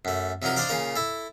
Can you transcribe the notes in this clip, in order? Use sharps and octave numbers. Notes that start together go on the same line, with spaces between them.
F#2 A3
C3 F3 F#3 D#4 A#4
D4 D#4 C5 D5 F5 D6
A#2 C#3 F4 A#4 F5
E4 A4